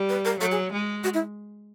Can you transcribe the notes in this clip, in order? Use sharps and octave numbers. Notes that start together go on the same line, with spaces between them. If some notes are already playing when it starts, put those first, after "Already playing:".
Already playing: G3
B4
A#4
F#3 A4
G#4
G#3
F#4
E4